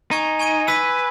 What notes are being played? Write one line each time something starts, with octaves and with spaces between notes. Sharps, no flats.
D#4 G#5 C#6 G#6 D#7
G#5 C#6 G#6 D#7
B4 E6 B6 D#7